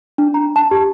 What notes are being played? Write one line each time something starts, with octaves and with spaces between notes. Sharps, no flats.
D4
A#5
A5
G4